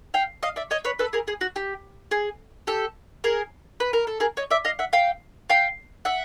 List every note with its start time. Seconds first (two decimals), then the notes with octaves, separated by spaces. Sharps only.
0.14 F5 G5
0.43 D#5 F5
0.56 D5 E5
0.71 C#5 D#5
0.84 B4 C#5
0.99 A4 B4
1.13 G#4 A#4
1.28 G#4
1.41 F#4
1.56 G4
2.11 G#4
2.67 G4 A4
3.24 G#4 A#4
3.80 B4
3.93 A#4
4.07 A4
4.20 G#4 A#4
4.37 C#5 D#5
4.51 D5 E5
4.65 D#5 F5
4.79 E5 F#5
4.93 F5 G5
5.50 F5 G5
6.05 E5 F#5